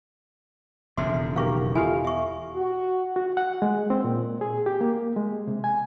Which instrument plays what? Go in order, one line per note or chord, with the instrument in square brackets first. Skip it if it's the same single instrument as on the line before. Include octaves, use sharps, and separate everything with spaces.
[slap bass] E1 F2 C#3 [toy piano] F#4 E5 C6
[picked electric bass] B2 D#3 F#3 [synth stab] B3 G4 A#4 [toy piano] F5 C#6
[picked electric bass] E2 B2 [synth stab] E4 F4 F5 [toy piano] G4 A4 G#5
[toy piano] E5 C#6
[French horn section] F#4
[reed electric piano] F#4
F#5
G#3
C4
A#2
G#4
G4
A#3
G#3
C3
G#5